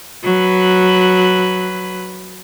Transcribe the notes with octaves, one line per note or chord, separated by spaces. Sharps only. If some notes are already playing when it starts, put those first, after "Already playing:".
F#3 B4